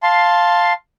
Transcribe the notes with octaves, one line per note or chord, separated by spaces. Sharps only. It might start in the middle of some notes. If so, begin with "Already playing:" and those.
F5 A5 C6